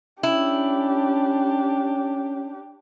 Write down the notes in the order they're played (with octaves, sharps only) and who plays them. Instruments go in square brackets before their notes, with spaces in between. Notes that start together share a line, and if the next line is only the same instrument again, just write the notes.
[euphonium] C#4 [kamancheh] D4 G4 [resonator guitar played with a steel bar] E4